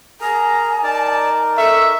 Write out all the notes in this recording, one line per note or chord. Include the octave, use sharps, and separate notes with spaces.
G#4 A#4 G#5 A#5
D#4 A#4 D5 A5
A4 E5 C#6